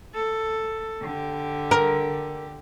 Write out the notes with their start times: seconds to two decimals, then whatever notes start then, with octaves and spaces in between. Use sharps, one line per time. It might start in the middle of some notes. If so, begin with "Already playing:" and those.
0.14 A4
1.02 D3 G4
1.71 A#4